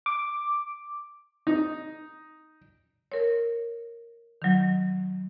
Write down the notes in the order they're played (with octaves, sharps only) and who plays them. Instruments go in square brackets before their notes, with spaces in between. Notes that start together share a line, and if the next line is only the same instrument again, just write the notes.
[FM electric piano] D6
[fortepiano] D#4
[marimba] A#4 C#5
D#3 F#3